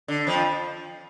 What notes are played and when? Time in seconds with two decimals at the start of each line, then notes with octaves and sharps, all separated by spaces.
0.08 D3
0.27 F2 F3